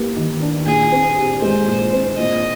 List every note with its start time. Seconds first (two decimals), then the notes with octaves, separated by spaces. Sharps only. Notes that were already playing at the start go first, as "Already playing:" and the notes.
Already playing: A#3 G4
0.16 D#3
0.41 D4
0.66 A#2 G#4
0.92 C4
1.17 G4
1.42 G#3 C5
1.67 A#2
1.92 C4
2.18 A#2 D#5